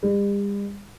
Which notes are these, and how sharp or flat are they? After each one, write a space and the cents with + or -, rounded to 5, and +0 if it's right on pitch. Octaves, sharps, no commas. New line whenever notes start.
G3 +45